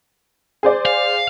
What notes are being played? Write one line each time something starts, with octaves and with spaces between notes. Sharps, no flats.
G#4 C5 D5
F5